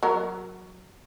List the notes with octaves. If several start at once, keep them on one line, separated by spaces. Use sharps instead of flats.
F#3 A#4